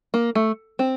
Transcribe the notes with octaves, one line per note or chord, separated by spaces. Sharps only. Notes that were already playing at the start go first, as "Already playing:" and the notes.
A#3
A3
C4